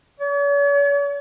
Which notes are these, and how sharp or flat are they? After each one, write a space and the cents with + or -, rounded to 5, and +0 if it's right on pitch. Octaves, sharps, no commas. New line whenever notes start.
C#5 +45